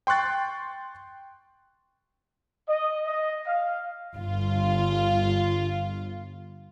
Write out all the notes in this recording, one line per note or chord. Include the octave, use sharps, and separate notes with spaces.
G5 C6 C#6 F#6 A6
D#5
D#5
F5
G1 F4